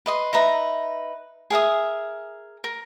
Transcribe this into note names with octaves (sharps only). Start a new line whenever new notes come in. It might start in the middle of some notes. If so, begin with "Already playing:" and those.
B4 D#5 C6
D#4 B4 E5 A#5
G#4 A#4 E5 D#6
A#4